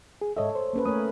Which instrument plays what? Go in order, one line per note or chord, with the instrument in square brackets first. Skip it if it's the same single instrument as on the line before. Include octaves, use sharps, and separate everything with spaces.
[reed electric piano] G#4
[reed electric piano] G#2 D#5 E5 [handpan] A4 C#5
[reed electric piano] C5
[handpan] A#3 C#4 B4
[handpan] A3 A#4 C#5 [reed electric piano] D#6